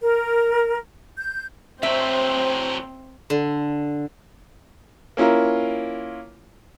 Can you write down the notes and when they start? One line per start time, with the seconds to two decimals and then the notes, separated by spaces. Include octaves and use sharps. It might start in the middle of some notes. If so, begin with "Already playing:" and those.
0.01 A#4
1.17 G6
1.83 A2 F#3 C4 C5 E5
3.30 D3
5.17 A#3 C#4 E4 F4 A#4